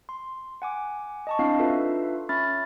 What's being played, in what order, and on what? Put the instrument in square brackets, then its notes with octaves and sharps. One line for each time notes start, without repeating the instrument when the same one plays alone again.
[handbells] C6
F#5 G#5 D6
D#5 A5 C#6
C4 D4 E4 F5 C#6 C7
D4 D#4 F4 A4 B4 E5
C#4 E5 B5 C#6 F6 A6